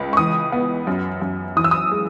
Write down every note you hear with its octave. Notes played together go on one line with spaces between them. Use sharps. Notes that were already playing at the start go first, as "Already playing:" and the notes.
Already playing: C#2
C#6
E3 D#6
B3
F#2
F#2
E3 D#6
E6
D#6
G#3